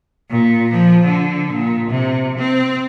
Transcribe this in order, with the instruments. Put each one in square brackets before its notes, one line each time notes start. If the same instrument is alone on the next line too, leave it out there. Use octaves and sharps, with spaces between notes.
[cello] A#2
F3
D3
A#2
C3
C4